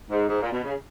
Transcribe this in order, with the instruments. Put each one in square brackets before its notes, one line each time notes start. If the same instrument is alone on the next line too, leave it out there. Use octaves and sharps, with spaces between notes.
[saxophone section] G#2
G#2
A#2
B2
C#3